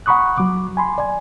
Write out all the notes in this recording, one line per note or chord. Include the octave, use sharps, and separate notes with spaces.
F#5 A#5 B5 C#6 D#6 F#6
F#3 D6
G#5 B5 C6
D5 G#5